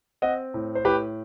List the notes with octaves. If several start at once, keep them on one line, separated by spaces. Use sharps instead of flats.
C4 D#5 F#5
A2
C5
A2 G4 B4